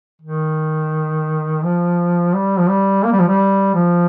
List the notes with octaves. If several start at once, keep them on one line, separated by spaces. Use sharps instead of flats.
D#3
F3
G3
F3
G3
A#3
G3
F3
G3
F3